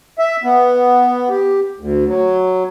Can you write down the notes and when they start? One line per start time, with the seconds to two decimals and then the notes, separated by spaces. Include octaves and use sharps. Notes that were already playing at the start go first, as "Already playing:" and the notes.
0.19 E5
0.43 B3
1.29 G4
1.80 D2
2.08 F#3